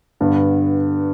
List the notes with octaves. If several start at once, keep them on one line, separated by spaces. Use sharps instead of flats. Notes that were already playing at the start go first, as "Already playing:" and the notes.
G2 D3 B3